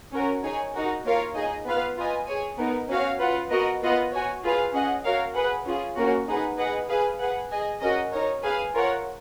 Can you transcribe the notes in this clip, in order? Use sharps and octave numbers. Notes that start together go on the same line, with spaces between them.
C#4 F#4 A#4
D#4 G#4 C#5 G#5
D#4 F#4 A#4
A#3 F4 A#4 C#5 F5
D#4 G#4 D#5 G#5
B3 F4 B4 F5
F4 B4 D#5 G#5
G#4 C#5 G#5
B3 D#4 A#4
C#4 F#4 C#5 F5
F4 B4 F#5
B3 F#4 A#4 D#5
B3 F4 B4 D#5 F#5
F#4 C#5 G#5
F4 G#4 B4 F5
C#4 G#4 D#5 F#5
F#4 A#4 C#5 F5
G#4 B4 F#5
C#4 F4 G#4
A#3 C#4 F#4 A#4
D#4 G#4 B4 F#5
G#4 B4 D#5 F#5
G#4 B4 F5
G#4 B4 F#5
G#4 D#5 G#5
C#4 F#4 A#4 D#5
D#4 A#4 C#5
G#4 B4 F5 G#5
F4 A#4 C#5 F#5